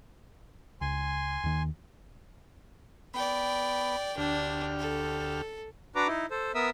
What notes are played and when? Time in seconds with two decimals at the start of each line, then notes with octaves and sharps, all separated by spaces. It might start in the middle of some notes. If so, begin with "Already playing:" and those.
0.81 C#2 G#5 C6
1.44 D#2 D#3
3.14 B3 D5 G5 B5
4.18 D2 D4 G4 F6
4.79 A4
5.95 D4 F#4 B4 A#5 D6
6.08 D#4 E4
6.31 A4 C5
6.55 B3 A#4 E5 D#6 E6